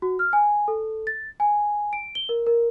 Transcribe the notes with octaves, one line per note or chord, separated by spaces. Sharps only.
F#4
F6
G#5
A4
A6
G#5
D7
G7
A#4
A#4